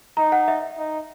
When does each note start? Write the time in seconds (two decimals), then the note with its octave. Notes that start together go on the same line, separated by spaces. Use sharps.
0.17 D#4 A#5
0.32 F#5
0.48 E5
0.78 D#4